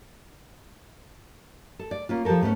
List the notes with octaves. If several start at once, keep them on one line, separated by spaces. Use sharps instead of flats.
A4
D5
A#3 C#4 F4
F3 F4 G4 A4 A#4
G#2 A3 B3 C#4